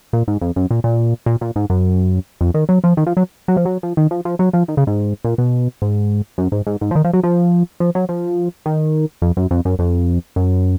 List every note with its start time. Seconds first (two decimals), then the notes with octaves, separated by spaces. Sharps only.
0.13 A#2
0.28 G#2
0.41 F2
0.56 F#2
0.71 A#2
0.84 A#2
1.26 A#2
1.41 A#2
1.56 G#2
1.70 F#2
2.41 F2
2.54 D#3
2.69 F#3
2.84 F3
2.97 D#3
3.06 F3
3.17 F#3
3.48 F#3
3.57 F3
3.65 F#3
3.83 F3
3.97 D#3
4.11 F3
4.25 F3
4.39 F#3
4.53 F3
4.68 D#3
4.77 C#3
4.87 G#2
5.24 A#2
5.38 B2
5.82 G#2
6.38 F#2
6.52 G#2
6.67 G#2
6.81 G#2
6.91 F3
6.95 D#3
7.04 F3
7.13 F#3
7.23 F3
7.80 F3
7.95 F#3
8.09 F3
8.66 D#3
9.22 F2
9.37 F#2
9.51 F2
9.65 F#2
9.79 F2
10.36 F#2